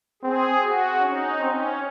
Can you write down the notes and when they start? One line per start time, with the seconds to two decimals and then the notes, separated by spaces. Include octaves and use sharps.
0.22 C4 G#4
0.62 F#4
1.00 C#4 D#4
1.39 C4 C#4